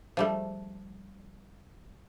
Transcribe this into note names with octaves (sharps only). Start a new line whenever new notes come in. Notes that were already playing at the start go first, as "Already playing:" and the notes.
F3 G3 A3